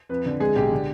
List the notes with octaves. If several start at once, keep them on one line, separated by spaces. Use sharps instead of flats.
F2 B4
D3
G#3 G#4
B1 G4
D3